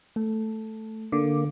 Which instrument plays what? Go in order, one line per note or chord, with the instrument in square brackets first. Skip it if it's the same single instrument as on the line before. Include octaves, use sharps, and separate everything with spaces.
[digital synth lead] A3
[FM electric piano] D3 [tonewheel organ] A#3 [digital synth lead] D6